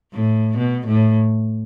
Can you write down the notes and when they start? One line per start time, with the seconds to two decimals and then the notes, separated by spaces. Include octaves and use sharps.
0.13 A2
0.58 B2
0.87 A2